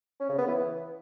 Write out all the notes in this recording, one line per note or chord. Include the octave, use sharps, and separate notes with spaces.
C#4
C#3
B3
E3